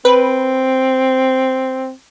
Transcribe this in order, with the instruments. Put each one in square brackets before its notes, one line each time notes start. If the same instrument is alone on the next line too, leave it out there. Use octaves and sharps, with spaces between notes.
[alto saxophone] C4 [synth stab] B4